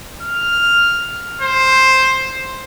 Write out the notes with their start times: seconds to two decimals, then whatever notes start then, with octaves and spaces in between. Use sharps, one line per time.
0.22 F6
1.41 C5